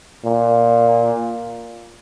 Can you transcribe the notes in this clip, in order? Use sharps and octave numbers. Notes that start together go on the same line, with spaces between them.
A#2